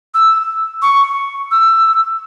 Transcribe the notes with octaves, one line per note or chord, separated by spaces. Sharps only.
E6
C#6
E6